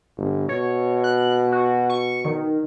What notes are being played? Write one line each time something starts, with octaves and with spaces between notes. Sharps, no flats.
G1
B2 C#5
F#6
F#4
C#6
D#3